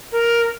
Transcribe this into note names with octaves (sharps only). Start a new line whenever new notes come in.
A#4